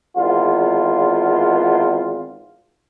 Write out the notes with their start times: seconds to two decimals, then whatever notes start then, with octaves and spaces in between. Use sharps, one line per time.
0.17 G#1 E2 F4